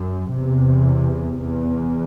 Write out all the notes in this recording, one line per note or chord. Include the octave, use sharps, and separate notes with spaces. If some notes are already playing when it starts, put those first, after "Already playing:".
Already playing: F#2
E2 C3
E2